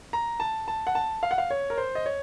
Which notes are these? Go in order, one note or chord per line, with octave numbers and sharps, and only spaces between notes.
A#5
A5
A5
F#5
A5
F5
F#5
F5
C#5
A#4
C5
D#5
C#5